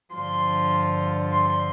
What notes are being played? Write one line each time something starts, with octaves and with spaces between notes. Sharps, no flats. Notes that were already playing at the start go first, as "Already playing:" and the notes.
G2 D3 F3 C6
C6